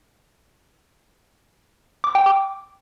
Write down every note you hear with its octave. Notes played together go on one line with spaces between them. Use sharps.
D6
G5
D6